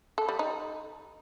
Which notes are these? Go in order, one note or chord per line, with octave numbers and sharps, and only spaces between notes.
A4
G3
D#4